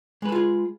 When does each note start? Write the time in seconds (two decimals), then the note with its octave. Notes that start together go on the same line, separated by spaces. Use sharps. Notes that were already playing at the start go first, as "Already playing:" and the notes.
0.22 G#3
0.25 B4
0.29 A4
0.32 F4
0.36 G#4